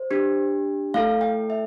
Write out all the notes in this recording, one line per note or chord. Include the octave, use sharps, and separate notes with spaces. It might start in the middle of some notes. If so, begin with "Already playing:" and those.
Already playing: C5
D4 G4
A3 E4 A4 F5
G5
E5